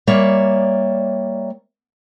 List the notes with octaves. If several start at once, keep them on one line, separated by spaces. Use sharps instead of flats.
G3 A#3 C#5 D5 E5